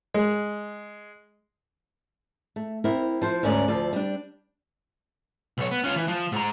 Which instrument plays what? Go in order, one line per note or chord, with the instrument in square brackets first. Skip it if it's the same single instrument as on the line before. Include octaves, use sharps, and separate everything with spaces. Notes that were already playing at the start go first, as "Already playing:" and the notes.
[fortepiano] G#3
[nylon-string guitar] A3
C4 E4 A#4
F3 C5
D2 G#2 C#4 A#4 D5
D2 F3 D5
G3 D4
[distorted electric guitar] B1 C#5
B3
C#4 F4
E3
F3
G#2 A#5